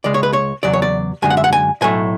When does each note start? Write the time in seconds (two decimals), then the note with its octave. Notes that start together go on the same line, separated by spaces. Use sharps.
0.04 C#2 C#3 G#3 D5
0.14 C#5
0.23 B4
0.33 C#5
0.63 E2 C#3 F#3 D5
0.73 C#5
0.82 D5
1.22 F#2 D3 G#3 G#5
1.30 F#5
1.37 E5
1.44 F#5
1.53 G#5
1.81 B1 A2 F#3 A3 G#5